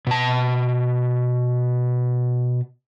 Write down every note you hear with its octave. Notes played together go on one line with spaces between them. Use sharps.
B2 A5